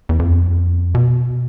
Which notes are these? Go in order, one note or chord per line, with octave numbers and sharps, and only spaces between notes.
E2
F2
B2